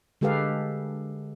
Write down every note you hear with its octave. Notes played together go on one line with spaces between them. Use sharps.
D3 G#3 G4 A4 B4 F5